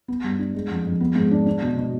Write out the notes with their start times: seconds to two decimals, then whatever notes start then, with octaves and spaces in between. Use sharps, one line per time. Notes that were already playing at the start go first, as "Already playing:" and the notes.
0.08 B3
0.24 G2
0.39 D4
0.54 G#3
0.70 F2
0.85 F2
1.00 B3
1.16 G#2
1.31 D4
1.46 D4
1.62 B2
1.77 B2